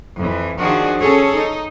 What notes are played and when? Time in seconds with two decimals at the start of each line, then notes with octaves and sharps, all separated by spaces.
0.20 F2 E3
0.61 D#3 F3 D4 F#4 G#4
1.02 C#4 G#4 A4 C#5
1.36 D#4